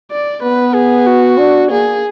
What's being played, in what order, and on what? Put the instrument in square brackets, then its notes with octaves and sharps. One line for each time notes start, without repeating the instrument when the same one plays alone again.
[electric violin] D5
[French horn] B3 [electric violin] B4
[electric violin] G#4
F#4
[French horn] D4
[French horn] A#3 [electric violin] G#4